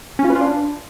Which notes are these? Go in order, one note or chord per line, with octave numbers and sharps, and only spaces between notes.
C#4
F4
B4
F4
D4